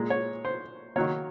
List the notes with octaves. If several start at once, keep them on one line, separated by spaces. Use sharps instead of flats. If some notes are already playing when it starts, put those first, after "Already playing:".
Already playing: A#2 G#3
C#5
C5
D#3 F#3 A#3 C#5